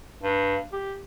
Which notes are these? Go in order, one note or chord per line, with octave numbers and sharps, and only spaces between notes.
G2
G4